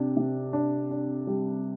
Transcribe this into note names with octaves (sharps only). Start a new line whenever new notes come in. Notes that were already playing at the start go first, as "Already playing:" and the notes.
Already playing: C3 D4
C3
D4
D4
G3